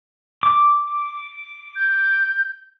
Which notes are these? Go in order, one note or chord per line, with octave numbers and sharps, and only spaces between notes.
D6
G6